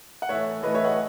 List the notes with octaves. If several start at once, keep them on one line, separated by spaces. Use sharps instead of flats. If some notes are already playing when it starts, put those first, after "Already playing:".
F#5
A2 E3 A3 C#5 E5
A2 E3 A3 B4 D#5
C#5 E5
D#5 F#5